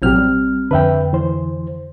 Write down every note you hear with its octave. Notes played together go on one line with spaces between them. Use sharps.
A1 B2 F#3 C4 G4 F6
G3
F2 D3 B4 E5 G5
E3 C5